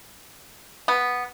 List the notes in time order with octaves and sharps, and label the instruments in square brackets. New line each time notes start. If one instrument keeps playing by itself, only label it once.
[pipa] B3